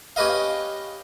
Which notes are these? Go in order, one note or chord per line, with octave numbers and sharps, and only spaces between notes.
C#4 G4 B4 D#5 F5